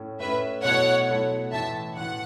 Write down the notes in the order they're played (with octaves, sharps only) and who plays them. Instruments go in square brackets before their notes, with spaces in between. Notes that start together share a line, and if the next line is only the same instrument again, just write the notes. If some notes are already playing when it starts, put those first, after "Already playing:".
Already playing: [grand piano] A2 A3 C#4
[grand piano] A2 A3 C#4 [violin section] B4 E5
[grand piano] B2 F#3 A3 E4 A4 [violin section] C#5 F#5
[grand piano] B2 F#3 A3 E4 A4
[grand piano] A1 A2 E3 [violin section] E5 A5
[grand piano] A1 A2 E3 [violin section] F#5